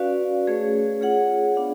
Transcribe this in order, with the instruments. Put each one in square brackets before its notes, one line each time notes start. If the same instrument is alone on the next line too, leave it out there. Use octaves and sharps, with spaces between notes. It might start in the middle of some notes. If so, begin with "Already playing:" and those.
Already playing: [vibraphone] C#4 F#4 B4 D5 F5
A3 C#4 G#4 C#5
F4 G#4 C#5 F#5
B3 D4 G#4 D5 F5